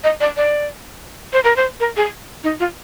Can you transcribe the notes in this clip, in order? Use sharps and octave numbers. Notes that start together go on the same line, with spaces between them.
D#5
D5
D5
C5
A#4
C5
A#4
G#4
D#4
F4